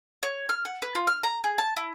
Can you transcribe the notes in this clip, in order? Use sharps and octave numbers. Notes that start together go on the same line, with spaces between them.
C#5
F6
F#5
B4
F4
F6
A#5
G#4
A5
E4